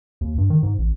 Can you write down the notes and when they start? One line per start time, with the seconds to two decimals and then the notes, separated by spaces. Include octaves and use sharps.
0.21 D#2
0.38 G2
0.50 D#3
0.63 G#2
0.79 A1